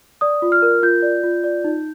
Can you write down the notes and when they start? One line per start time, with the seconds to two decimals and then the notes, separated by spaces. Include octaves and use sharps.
0.21 D5 D#6
0.42 F4
0.52 F6
0.62 A#4
0.83 F4 G6
1.02 D5
1.23 F4
1.44 D5
1.64 D#4